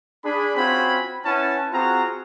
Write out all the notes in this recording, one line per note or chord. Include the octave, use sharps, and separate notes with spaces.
D4 G#4 B5
C4 C#4 F4 F#4 G#5 B5
C#4 E4 B4 F#5 A5
C4 F4 F#4 G#4 F#5 A#5